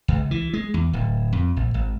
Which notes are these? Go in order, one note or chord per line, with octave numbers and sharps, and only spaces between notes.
C#2
E3
G#3
E2
D1
F2
A#1
G#1